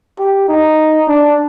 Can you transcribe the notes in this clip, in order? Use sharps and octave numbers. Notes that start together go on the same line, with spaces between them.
G4
D#4
D4